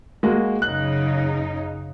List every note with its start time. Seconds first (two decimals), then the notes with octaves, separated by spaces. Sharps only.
0.23 G#3 A#3 F#4
0.62 F#2 C#3 D#4 F#6